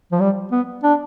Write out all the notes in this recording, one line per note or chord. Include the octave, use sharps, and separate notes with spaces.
F3
G3
B3
D4